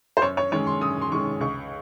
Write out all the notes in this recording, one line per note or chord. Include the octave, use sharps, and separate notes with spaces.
C5
F#2 C#5
C#5
D#3 G#3 C#4 C#5
C6
F#2 D#6
C6
D#3 G#3 C#4 C#6
C#2 C#6